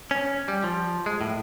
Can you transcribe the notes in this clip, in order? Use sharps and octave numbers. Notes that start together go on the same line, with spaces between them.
C#4
G3
F3
G#3
A2